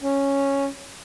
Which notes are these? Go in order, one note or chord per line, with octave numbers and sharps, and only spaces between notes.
C#4